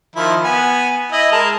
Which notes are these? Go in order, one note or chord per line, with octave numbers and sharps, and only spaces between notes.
D#3 F3 E4
B3 G#5
E4 D#5
G#3 A#4 A5